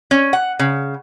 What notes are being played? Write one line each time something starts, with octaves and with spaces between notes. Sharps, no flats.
C#4
F#5
C#3